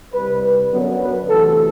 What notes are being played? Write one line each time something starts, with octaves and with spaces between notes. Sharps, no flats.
C2 C3 G3 B4
F#2 D3 F#3 B3
B4
D2 C3 E3 A4